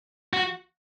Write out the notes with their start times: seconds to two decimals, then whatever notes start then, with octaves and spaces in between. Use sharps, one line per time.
0.33 F#4